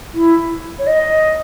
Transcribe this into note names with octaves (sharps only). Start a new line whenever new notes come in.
E4
C#5
D#5